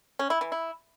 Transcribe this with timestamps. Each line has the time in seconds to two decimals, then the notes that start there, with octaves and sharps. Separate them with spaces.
0.19 C#4
0.30 E4
0.41 E3
0.52 E4